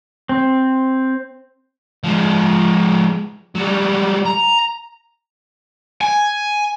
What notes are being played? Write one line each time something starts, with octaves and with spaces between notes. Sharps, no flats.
C4
F3 G#3
F#3 G3
A#5
G#5